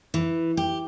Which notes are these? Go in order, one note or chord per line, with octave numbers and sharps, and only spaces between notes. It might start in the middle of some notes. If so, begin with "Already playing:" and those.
E3
G4